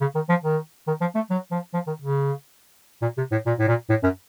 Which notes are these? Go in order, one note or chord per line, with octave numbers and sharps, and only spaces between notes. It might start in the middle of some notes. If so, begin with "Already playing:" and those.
C#3
D#3
F3
D#3
D#3
F3
A3
F#3
F3
F3
D#3
C#3
A#2
C3
A2
A#2
A2
A#2
A2
F#2